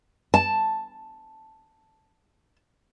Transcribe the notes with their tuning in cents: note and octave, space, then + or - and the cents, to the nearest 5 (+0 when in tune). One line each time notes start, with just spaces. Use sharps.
A5 +0